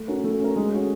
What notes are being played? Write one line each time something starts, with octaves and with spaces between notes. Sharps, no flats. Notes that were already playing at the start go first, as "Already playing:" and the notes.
Already playing: A3
C#4 F#4 A#4
A3
C#4 F#4 A#4
G#3
C#4 F#4 A4